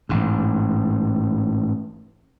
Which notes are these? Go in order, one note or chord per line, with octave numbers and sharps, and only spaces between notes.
A1 G#2